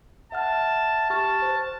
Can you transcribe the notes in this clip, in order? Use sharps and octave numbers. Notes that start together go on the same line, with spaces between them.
E5 F#5 A5 F6
G4 A5 C#6 F6
C5